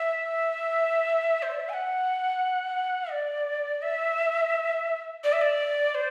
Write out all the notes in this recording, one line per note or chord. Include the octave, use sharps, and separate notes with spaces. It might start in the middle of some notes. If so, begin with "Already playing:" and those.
Already playing: E5
C5
D5
E5
G#5
F#5
D5
E5
D5
E5
D5
C5